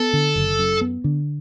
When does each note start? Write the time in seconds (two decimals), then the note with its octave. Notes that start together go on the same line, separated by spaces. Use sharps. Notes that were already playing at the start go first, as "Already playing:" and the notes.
Already playing: B3 A4
0.13 D3
0.35 F#1
0.58 F#2
0.81 B3
1.04 D3